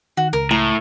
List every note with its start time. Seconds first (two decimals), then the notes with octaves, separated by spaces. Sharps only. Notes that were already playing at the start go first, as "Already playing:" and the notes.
0.17 D#3 F#4
0.33 C#2 A#4
0.51 A2 A#5